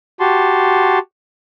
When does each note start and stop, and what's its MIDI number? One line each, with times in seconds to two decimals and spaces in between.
0.20 0.99 66
0.20 0.99 67
0.20 0.99 81
0.20 0.99 84